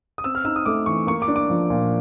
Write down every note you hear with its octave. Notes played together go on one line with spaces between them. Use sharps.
D#6
C4 E6
F6
D#4 E6
D#6
A3 D6
E3 C#6
A#3 C#6
D6
D4
D6
F3
A#2